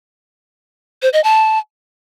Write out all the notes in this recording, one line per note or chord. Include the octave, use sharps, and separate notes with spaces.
C5
D#5
A5